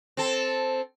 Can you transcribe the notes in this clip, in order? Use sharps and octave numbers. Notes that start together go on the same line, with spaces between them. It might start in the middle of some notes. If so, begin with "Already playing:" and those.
C4 A4